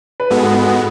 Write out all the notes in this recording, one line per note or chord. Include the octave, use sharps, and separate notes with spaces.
B4
G#2 G#3 B3 F#4 A4
F#4
F#4
F#4